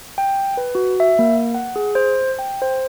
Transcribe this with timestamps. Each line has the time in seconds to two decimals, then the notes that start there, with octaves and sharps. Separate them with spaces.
0.18 G5
0.57 B4
0.75 F#4
1.00 E5
1.19 A#3
1.55 F#5
1.76 G#4
1.95 C5
2.39 G5
2.62 C5